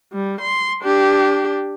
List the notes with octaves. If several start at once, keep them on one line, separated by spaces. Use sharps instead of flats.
G3
C6
D4 G4